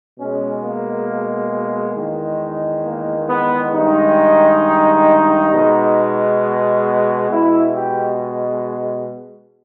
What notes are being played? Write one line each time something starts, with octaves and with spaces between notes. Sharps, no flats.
B2 G#3 C#4
A#3
E2 D#3 G#3
A#3
B3
G2 D#3 G#3 D#4
B2 G#3
B2 G#3 E4
G4